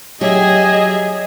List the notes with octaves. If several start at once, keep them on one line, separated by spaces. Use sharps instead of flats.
F#3 G4 G#4 D#5 E5